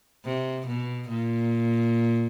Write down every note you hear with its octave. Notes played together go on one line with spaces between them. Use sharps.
C3
B2
A#2